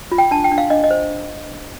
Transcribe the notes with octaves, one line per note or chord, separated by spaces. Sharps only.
F4
G5
D4 A5
G5
D4
F5
D4 D#5
D#5
C5